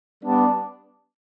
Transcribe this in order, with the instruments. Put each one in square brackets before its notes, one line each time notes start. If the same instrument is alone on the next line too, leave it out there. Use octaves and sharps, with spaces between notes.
[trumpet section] G3 B3 D4